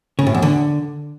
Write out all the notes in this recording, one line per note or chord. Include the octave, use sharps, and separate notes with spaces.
C#3
A2
E2
D3